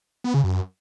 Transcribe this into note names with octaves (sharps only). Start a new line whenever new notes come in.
B3
C#3
F#2